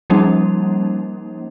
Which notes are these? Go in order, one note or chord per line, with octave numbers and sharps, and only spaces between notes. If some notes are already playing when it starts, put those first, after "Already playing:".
F3 G3 A#3 C#4 D#4